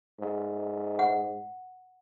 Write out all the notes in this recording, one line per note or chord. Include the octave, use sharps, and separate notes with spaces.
G#2
F#5